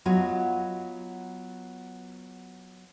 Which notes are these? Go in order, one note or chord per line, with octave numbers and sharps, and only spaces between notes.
F#3 B3 F4 C#5 D#5